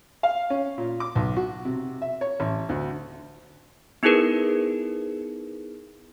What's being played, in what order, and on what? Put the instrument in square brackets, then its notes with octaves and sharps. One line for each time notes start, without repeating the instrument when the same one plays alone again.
[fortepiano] F5
C#4
A#2
D6
B1
F#4
C3
E5
C#5
A1
D2
[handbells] B3 D#4 E4 G#4 A#4 B4